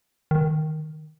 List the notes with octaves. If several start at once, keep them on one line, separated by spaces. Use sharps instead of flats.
D#3